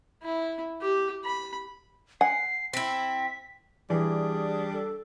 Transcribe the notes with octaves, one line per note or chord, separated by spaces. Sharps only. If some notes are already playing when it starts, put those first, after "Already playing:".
E4
G4
B5
F#5 G#5 C7
C4 E4 B6
E3 G3 D4 G#4
A4